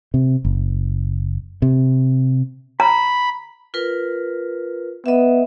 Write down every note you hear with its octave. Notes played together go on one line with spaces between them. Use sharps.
C3
F#1
C3
A#5 B5
F4 A#4 B4
B3 D#5 E5